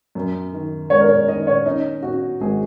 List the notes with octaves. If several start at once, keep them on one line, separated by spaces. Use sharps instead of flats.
F#2
D#3
G#3 C#5
A#4
C#5
D#3 D#5
C#5
C#4 D#4
C#4 F#4
G#1 G#4